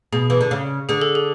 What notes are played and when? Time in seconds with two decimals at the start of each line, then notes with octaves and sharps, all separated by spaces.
0.12 B2 G#4
0.30 E3
0.41 D3
0.51 C#3
0.89 D3 G#4
1.02 A4
1.15 G#4